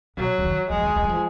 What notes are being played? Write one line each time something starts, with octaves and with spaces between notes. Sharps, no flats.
B2 F#3
C#3
D#3
F3 G#3
D#3
D#3
F#3
F3